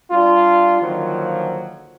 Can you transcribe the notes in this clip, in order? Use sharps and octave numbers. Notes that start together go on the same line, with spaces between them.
G3 D4 F4
D3 D#3 F3 F#3 A#3